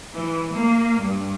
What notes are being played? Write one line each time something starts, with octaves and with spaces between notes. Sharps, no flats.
E3
A#3
G2